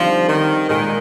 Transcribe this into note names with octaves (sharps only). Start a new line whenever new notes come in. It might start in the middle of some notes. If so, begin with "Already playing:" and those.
Already playing: D3 F3 G3 C4 D#4
D#3
A#2 D#3 G#3 D#4